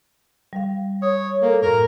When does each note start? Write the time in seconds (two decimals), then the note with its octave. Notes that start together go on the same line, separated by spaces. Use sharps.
0.53 G3 F5
1.02 C#5 D#6
1.42 A#3 A4 A#4
1.62 F#2 A2 A#4